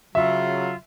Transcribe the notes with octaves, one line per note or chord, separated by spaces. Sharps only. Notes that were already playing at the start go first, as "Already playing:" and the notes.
C#3 F#3 F4 E5